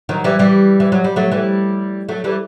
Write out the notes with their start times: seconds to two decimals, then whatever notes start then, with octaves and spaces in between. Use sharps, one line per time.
0.09 D#3 F#3
0.24 E3 G3
0.39 E3 G3
0.80 E3
0.92 F#3
1.04 G3
1.16 F#3 A3
1.32 E3 G3
2.09 F#3 A3
2.24 E3 G3